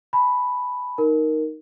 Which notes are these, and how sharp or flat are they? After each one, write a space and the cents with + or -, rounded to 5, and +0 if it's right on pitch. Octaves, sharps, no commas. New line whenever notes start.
G#5 +45 B5 +0
D#4 +0 A#4 +0